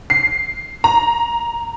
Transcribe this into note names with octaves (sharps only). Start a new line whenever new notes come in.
C7
A#5